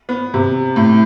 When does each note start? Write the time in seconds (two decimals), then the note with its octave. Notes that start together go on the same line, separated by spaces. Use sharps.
0.09 B3
0.34 C3
0.76 A2